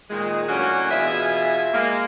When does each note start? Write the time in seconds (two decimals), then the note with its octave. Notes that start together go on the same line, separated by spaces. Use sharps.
0.10 A#2 D#3 G#3
0.49 F#2 A2 A#3 C#4 D4 F#4
0.91 B2 E3 F4 G#4 E5
1.74 G#3 A#3